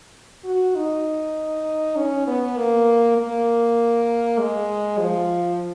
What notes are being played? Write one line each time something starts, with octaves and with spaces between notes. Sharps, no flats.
F#4
D#4
C#4
B3
A#3
A#3
G#3
F3